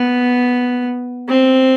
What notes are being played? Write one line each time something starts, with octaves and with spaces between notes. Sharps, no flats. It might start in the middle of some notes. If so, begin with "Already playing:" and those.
Already playing: B3
C4